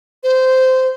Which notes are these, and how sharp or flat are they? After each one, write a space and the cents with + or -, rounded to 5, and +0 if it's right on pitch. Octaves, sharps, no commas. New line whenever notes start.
C5 -15